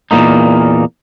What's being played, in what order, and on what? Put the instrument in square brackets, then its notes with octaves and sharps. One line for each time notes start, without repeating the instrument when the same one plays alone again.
[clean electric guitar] E2 A#2 F3 A3 A#3 D#4